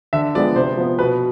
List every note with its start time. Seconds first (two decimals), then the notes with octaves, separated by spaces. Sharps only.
0.13 D3 E5
0.35 F3 G#3 B3 D5
0.56 C3 C5
0.77 F3 B3
0.99 B2 B4